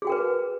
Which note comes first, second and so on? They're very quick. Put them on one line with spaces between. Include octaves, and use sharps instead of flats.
G#4 F#4 G5 A#4 B4